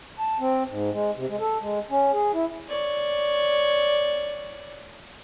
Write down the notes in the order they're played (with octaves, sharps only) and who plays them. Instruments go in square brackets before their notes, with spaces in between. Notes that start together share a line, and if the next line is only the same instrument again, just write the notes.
[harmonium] A5
C4
G#2
G#3
C3
G#3
A4
G#3
C#4
G#4
E4
[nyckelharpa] C#5 D5